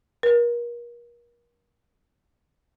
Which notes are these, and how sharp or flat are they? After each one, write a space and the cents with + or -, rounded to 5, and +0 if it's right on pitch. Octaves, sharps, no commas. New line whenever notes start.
A#4 +35